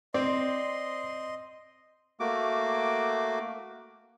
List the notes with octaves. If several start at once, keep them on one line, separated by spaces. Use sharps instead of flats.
C4 C5 D5 D#5 C6
A3 A#3 F#4 D6